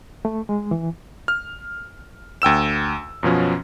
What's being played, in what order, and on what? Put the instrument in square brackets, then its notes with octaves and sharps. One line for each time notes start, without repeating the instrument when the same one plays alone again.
[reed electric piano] A3
G#3
E3
[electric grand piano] F6
D2 G5 E6 E7
F#2 B2 F3 C#4